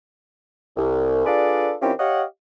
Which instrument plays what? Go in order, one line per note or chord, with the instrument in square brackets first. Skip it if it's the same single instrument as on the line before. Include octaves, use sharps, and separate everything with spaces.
[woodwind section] C2
D4 F4 G#4 A4 B4 D5
D#3 C4 C#4 E4 F4 G4
G4 C#5 D#5 F5 F#5